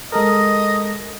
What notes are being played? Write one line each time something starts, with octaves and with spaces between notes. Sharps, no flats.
G#3 A4 A#4 D#5